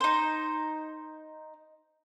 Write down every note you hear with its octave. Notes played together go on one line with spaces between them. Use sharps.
D#4 C5